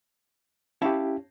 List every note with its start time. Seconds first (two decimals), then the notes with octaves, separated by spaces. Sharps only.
0.82 C#4 E4 G4 F5 A5